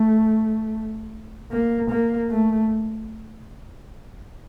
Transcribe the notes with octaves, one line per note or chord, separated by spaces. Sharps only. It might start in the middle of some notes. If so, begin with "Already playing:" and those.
Already playing: A3
A#3
A#3
A3